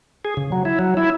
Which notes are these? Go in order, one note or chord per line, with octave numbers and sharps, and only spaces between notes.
G#4
C#3
F#3
E4
F#3
E4